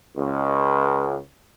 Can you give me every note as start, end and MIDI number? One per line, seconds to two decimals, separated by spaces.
0.17 1.19 37